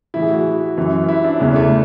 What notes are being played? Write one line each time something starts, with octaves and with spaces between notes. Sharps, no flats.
A2 E3 E4
G#4
F#4
F#2 E3
E4
D4
E2 C#3 E3 B3
A3